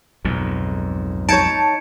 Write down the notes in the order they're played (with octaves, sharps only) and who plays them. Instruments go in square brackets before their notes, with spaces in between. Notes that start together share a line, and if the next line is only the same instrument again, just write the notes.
[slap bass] B1 F2 G#2
[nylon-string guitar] D#4 C#5 [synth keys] A5 [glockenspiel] G#6 C#7 D7